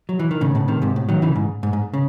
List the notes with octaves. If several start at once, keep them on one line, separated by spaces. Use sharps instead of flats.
F#3
E3
D#3
A2 C#3
A2 C#3
C3 D#3
G#2 C3
A2
D#3 F#3
C#3 E3
G#2
G#2
G#2
C#3